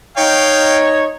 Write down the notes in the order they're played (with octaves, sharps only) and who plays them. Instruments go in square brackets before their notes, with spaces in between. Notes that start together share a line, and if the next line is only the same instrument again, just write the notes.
[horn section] D#4 C#5 [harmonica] F5 G5